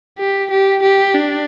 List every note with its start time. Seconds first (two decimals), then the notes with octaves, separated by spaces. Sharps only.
0.19 G4
0.51 G4
0.83 G4
1.14 D4